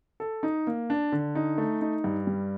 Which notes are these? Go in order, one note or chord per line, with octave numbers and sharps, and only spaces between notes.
A4
D#4
A#3
D4
D3
D#4
A3
D#4
G2
G3